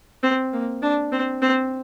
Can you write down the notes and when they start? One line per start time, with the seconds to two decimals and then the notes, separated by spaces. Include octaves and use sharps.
0.23 C4
0.53 A#3
0.83 D4
1.12 C4
1.42 C4